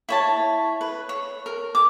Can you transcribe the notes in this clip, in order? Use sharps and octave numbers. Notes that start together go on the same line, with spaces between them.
E4 C#5 A5
B4
C#5
A#4
D6